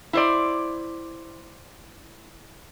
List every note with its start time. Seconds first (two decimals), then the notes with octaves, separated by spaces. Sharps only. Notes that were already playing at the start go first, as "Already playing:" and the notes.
0.13 E4 C5 D5